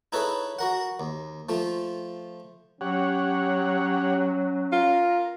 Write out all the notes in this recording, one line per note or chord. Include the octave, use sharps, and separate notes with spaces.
D#4 E4 G#4 A4 B4 C#5
F#4 A#4 F#5
D#2
F3 A3 F4
F#3 C#4 G4 C#5 F#5
F4 A#4